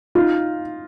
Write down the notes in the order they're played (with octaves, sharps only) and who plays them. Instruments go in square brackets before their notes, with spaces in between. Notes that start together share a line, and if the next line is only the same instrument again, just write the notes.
[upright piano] D#4 F4